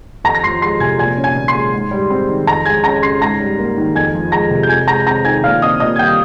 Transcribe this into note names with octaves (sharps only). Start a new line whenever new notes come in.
F2 A#5 A#6
A#6
F3 C6 C7
G#3 C6 C7
C3 G#5 G#6
A#2 G#5 G#6
C#4
G#5 G#6
A#2
C6 C7
G#3
G#2
G3
C4
D#3
F2 A#5 A#6
G#3 G#5 G#6
C#4 A#5 A#6
C#3 C6 C7
G#2 A#5 A#6
G3
A#3
D#3
F2 G#5 G#6
F3
G#3 A#5 A#6
C3
G6
F2 G#5 G#6
G#3 A#5 A#6
C4 A#5 A#6
D#3 G#5 G#6
A#2 F5 F6
C4 D#5 D#6
A#2 D#5 D#6
G#6
G3 G5 G6